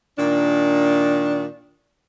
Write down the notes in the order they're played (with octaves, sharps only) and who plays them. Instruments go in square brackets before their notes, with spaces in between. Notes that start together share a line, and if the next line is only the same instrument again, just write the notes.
[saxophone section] A#2 D#3 D4